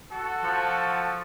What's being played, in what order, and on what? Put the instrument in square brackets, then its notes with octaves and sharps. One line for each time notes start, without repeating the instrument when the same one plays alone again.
[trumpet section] F#4 A4
[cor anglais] F3